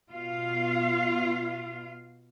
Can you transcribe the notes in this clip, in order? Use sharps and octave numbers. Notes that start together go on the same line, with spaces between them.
B2 F4 F5